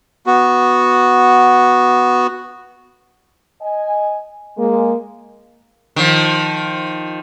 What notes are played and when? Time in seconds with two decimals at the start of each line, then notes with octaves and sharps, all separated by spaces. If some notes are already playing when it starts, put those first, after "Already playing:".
0.27 B3 F#4
3.61 D#5 G#5
4.57 G#3 A#3
5.96 D#3 F3